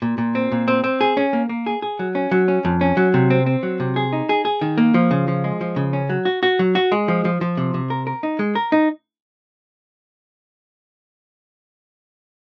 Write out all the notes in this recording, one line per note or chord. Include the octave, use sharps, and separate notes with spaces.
A#2
A#2
C4
A#2
C4
C4
G#4
C#4
A#3
A#3
G#4
G#4
F#3
C#4
F#3
C#4
F2
C#4
F#3
C3
C4
C4
F#3
C3
G#4
D#4
G#4
G#4
D#3
A#3
F3
C#3
F3
G#3
F3
C#3
C#4
F#3
F#4
F#4
F#3
F#4
G#3
F3
F3
F3
C3
C3
A#4
A#4
D#4
G#3
A#4
D#4